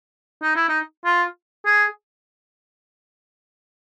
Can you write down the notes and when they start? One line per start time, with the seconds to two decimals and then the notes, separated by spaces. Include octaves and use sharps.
0.42 D#4
0.56 E4
0.69 D#4
1.05 F4
1.66 G#4